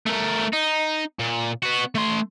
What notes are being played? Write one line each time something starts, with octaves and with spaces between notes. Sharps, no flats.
A3 A#4
D#4
A#2
B3 F#4
A3 C6